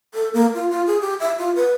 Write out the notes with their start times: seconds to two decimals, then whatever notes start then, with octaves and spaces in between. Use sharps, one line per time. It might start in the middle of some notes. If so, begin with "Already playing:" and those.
0.14 A4
0.34 A#3
0.54 F4
0.70 F4
0.87 G#4
1.01 G4
1.20 E5
1.39 F4
1.55 B4